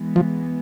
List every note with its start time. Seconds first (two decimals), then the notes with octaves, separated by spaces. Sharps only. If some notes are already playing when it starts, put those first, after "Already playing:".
Already playing: E3 G#3 B3
0.16 F3